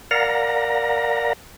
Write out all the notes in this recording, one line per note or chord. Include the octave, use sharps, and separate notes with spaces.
A#4 D5 F5 F#5 A#5 A#6